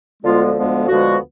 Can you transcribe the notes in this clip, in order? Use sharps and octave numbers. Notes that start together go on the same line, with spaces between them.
D2 D3 F3 G#3 B3 F4
D2 D3 F3 G#3 B3
D2 D3 F3 G#3 B3 F#4